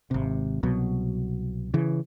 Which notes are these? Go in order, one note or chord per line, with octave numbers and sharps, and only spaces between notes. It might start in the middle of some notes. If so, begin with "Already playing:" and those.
G#1 C3
C2 B2 F#3
C#3 E3